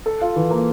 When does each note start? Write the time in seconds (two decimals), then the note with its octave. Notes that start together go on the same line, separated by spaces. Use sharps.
0.06 A4
0.21 F4
0.36 E3
0.50 A#3